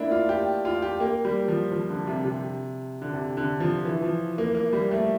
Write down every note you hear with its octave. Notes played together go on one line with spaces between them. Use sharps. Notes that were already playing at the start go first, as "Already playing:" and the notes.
Already playing: A3 A#3 D4 E4
F4
G4
F4
G4
A#3
G3
F3
F3
D3
C3
C3
D3
C3
D3
F3
E3
F3
A#3
A#3
G3
A3